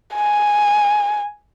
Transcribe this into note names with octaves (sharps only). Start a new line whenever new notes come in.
G#5